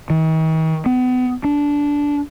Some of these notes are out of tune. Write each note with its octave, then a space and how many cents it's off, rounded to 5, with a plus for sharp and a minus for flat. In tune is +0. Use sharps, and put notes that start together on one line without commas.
D#3 +45
B3 +35
D4 -15